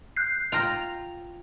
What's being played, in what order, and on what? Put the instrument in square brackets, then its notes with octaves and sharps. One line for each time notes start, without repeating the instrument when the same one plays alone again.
[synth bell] F#6 G6 C7
[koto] F4 G5 A#5 [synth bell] F7